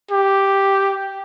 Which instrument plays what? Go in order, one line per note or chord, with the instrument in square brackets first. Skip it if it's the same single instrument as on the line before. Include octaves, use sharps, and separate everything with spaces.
[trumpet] G4